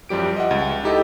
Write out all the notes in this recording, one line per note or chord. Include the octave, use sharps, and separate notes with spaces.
F#2 F3 G3 G4 D7
D#5 E5 F#5
C#2
D#4 E4 G4 A4 D#5